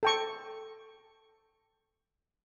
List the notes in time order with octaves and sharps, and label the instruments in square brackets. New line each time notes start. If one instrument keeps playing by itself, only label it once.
[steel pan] A4 G5 C#6